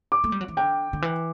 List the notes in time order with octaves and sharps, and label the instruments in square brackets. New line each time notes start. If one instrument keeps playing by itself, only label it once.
[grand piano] D6
[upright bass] A3
G3
F#3
E3
[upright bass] D3 [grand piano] G5
[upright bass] D3
E3